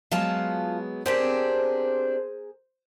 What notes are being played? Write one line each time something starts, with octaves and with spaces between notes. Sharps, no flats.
F#3 G#3 B3 F4 F5 A5
C4 D4 G4 G#4 A#4 C5